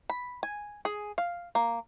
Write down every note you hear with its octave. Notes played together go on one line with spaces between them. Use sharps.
B5
G#5
G#4
F5
A#3